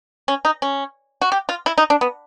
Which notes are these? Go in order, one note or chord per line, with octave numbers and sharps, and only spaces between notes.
C#4
D#4
C#4
F#4
G4
F4
E4
D#4
D4
B3